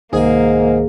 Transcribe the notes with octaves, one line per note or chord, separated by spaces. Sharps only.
C2 G#2 D#3 A#3 G#4